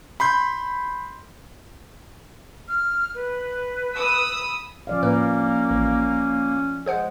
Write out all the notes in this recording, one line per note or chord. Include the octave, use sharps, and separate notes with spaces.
B5 C6 G6
F6
B4
B5 D#6 E6
F3 C#4 D5 F5
A2 A#3 B4
A1
G#3 G#4 C5 F#5